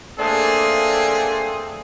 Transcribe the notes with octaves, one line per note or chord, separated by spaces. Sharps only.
A3 A#3 C4 D4 G#4